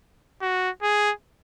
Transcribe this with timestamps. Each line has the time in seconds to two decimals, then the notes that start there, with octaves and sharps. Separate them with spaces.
0.41 F#4
0.83 G#4